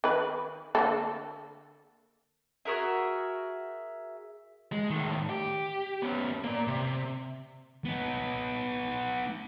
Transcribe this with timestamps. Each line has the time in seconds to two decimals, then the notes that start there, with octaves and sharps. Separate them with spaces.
0.04 D#3 B4
0.75 D3 A#3 A4
2.65 F#4 G#4 A#4 E5
4.72 G#3
4.90 A2 D#3
5.30 G4
6.02 B3 C#4
6.44 A#3 D5
6.68 C3
7.85 B3 D#4